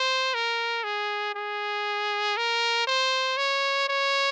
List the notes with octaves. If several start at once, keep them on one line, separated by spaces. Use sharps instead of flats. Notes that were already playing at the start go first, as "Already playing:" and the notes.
Already playing: C5
A#4
G#4
G#4
A#4
C5
C#5
C#5